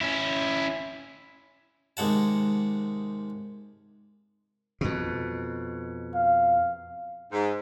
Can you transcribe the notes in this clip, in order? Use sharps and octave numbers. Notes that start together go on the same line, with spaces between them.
C#4 E4
D#2 C3 G#3 F#5 A5
F2 B2
F5
G#2